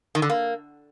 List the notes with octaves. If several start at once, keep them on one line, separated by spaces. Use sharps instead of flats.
D#3
D3
A#3